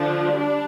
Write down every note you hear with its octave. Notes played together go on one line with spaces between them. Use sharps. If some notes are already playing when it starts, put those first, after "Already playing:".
Already playing: D3 F3 D4
G3 D4